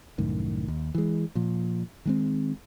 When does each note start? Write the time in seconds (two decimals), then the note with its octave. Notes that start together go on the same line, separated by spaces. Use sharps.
0.18 C2 F#2 A2 D#3
0.68 D#2
0.95 E3 G#3
1.35 A#2 F3
2.05 D#3 G#3 C4